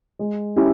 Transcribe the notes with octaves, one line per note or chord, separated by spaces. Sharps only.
G#3
C#4 E4 G4